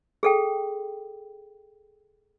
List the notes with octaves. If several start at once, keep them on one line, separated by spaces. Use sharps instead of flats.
G#4 A4 G5